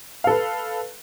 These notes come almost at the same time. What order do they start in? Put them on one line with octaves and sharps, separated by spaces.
F5 A4 B4